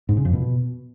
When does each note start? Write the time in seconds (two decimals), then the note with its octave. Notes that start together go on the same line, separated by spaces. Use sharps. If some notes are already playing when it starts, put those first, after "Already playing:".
0.09 G#2
0.17 C#3
0.25 F2
0.33 B2